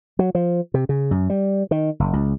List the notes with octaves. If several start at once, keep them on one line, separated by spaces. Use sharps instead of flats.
F#3
F3
C3
C#3
F#2
G3
D#3
F#1
C#2